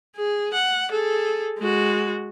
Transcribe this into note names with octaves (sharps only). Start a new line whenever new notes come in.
G#4
F#5
G#4 A4
G#3 F#4